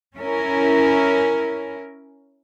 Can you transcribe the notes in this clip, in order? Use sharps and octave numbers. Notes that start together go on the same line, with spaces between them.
C#4 E4 A#4